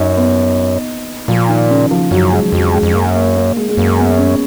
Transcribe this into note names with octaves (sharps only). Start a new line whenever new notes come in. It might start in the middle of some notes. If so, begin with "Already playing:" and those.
Already playing: F#2 D#4
B3
A#2 F3
D#3
C#3
F3
F#2 F#3
G#3
F2 F#3
G#3
F2
F#2 A#3
A#3
A#3
G#3
G#3
F#2 A#3
B3
C#4